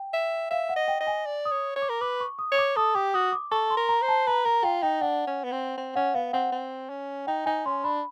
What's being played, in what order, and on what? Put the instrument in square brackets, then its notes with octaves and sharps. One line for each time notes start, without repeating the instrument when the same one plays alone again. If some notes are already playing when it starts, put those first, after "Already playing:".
Already playing: [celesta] G5
[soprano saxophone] E5
[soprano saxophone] E5 [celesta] F5
[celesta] F#5
[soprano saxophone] D#5
[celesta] G5
[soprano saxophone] D#5
[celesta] G#5
[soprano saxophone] D5
[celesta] D#6
[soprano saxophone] C#5
C#5
[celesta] D6
[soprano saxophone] A#4
[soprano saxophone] B4 [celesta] D6
[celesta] C#6
D#6
[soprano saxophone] C#5
[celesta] D6
[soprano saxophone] A4 [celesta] D#6
[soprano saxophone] G4 [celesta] D6
[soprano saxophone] F#4 [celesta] D#6
[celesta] D6
[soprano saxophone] A4 [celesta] C#6
[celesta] C6
[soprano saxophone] A#4
[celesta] A#5
[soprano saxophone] C5
[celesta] A5
[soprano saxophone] B4 [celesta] A#5
[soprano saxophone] A#4 [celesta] A#5
[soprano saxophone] F4 [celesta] G5
[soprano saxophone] D#4 [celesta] G5
[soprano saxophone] D4 [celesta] F#5
[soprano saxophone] C#4
B3
C4
C4
[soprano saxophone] C#4 [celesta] F#5
[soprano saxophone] B3 [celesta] F5
[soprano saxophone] C4 [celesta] F#5
[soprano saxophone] C4
C#4
[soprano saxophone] D#4 [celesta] G5
[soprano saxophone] D#4 [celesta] G#5
[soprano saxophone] C#4 [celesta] C6
[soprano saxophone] D4 [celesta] B5